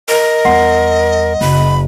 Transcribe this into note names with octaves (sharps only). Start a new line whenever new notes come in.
A#4 D#5
E2 G3 F#5 C6 C7
F#1 B5